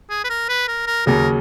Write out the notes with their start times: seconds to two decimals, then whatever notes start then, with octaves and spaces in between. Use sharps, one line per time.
0.10 G#4
0.24 B4
0.30 A#4
0.49 B4
0.68 A#4
0.87 A#4
1.06 D#2 C#3 F#3 A#4